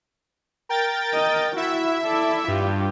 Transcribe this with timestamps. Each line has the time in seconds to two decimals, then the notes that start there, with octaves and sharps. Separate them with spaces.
0.69 A#4 G5 A6
1.14 D#5
1.56 E4 F#4 E5
2.05 A4 D5
2.48 G2 F4 G4